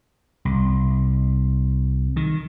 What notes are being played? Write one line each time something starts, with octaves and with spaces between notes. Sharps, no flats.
C2
D#3